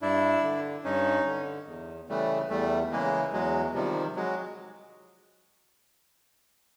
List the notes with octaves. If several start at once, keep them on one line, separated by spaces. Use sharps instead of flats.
G2 D4 E4
D3
G2 C#4 D#4
D3
E2
C#3 E3 G3 A3
E2 G3 A3
C#3 E3 G#3 A#3
E2 F#3 G#3
C3 D#3 F3 G3
F#3 G#3